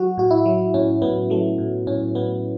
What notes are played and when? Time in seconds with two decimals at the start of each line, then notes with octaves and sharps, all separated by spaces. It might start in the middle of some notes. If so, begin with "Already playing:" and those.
Already playing: F#3 F#4
0.18 A2 F#4
0.31 E4
0.46 F#3
0.74 A2 C#4
1.02 A2 B3
1.30 F#3 A3
1.58 A2
1.87 A2 C#4
2.15 A2 B3